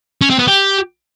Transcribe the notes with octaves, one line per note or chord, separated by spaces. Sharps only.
C#4
C4
B3
G4